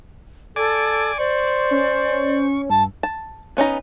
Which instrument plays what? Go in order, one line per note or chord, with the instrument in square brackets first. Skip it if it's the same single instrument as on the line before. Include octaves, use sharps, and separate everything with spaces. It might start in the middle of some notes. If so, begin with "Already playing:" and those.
[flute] A4 [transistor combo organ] D5 G#5 D6
[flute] C5 [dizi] D5 [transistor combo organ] C#6
[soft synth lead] C#4
[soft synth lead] G2 [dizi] A5
[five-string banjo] A5
B3 C#4 D#4 A#5